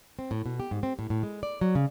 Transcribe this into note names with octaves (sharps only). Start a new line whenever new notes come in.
C4
A2
B2
G4
G#2
C4
A2
A2
G#3
D5
F#3
C#3